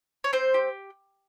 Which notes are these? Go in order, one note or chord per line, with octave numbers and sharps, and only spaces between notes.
C#5
C4 C5
G4